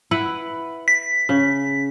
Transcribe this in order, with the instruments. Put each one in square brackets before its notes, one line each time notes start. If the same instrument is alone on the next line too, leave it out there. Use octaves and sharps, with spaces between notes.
[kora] E4 B4 F#5
[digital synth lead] B6
[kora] C#3